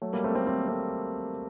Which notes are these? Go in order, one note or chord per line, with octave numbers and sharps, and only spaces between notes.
F#3 A3
G3 A#3
A3 C4
A3 C4
C4
A#3
A3 C4